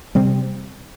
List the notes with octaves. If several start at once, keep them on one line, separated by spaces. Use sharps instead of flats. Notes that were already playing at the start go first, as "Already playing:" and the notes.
C3 G3 C4